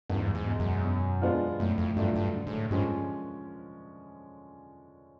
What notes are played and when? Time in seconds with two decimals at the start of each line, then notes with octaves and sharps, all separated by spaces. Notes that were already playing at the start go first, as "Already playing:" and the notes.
0.10 E2 G2
0.17 G#2
0.25 G2
0.35 G#2
0.47 B2 G#3
0.60 F#2
0.84 B2
1.22 G#3 B3 D4 F4
1.59 F#2 A2
1.78 F2
1.96 G2 F#3 A3 D4 F4
2.16 G2
2.34 D3
2.47 G#2
2.53 A2
2.71 G2 F3 G#3 C#4